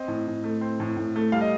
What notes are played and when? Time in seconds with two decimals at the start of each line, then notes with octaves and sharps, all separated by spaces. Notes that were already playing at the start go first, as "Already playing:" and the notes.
Already playing: C4 D#5
0.08 A2
0.27 A2
0.44 A3
0.61 C4
0.80 A2
0.97 A2
1.16 A3
1.32 G3 F5
1.41 D#5